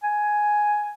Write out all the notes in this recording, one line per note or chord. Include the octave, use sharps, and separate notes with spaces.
G#5